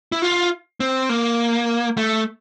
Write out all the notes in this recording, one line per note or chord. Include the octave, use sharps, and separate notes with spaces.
E4
F4
C4
A#3
A3